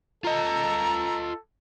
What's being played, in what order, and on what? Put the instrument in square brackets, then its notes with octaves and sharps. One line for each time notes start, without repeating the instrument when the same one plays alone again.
[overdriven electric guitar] F4 D#5 [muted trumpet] A4 [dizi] A#5